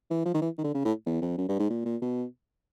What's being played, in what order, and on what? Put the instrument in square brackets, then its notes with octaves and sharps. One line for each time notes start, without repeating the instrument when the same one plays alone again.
[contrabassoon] E3
F3
D#3
E3
D#3
D3
C#3
A2
E2
F2
F#2
G2
G#2
A#2
A#2
B2